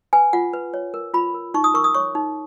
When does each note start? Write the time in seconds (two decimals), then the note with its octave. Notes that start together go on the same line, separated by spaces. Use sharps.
0.13 B4 G#5
0.33 F4 F#5
0.54 B4
0.74 C#5
0.94 A#4
1.14 F4 B5
1.34 A#4
1.54 D#4 C#6
1.64 D#6
1.74 A#4 C#6
1.84 D#6
1.94 C#5 C#6
2.15 D#4